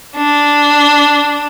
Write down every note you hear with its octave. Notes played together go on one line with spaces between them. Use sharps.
D4